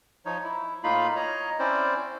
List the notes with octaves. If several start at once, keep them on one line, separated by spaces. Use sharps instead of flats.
F3 D#4 C#5
E4
A2 A#3 D#4 F4 F5 B5
C#5 D#5 A#5
C4 C#4 E4 C5 D5